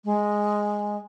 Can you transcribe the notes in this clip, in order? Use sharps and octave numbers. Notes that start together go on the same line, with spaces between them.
G#3